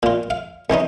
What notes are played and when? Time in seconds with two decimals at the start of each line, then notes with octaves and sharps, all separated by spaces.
0.03 A#2 F4
0.30 F5
0.70 C2 E3 C#4 D#4